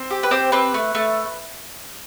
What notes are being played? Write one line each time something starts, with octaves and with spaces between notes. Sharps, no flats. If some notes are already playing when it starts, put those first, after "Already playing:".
Already playing: C4
G4
B4
C4 G4 C5
C4 B4
A3
A3